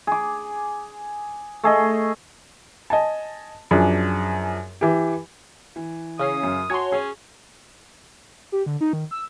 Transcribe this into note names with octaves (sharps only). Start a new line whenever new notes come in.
G#4 D6
A3 G#4 D#5
D#5 G#5 A5
F#2 F3 D4 G#4
E3 G4
E3
C#3 C#4 D#6 C7
F#2
F#4 C#5 G#5 A5 C6
C#4 G#4
G4
D3
D#4
D#3
E6